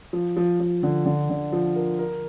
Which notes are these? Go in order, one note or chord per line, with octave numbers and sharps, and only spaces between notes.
F3
F3
F3
D3
D3
D3
F3
A#4
A#4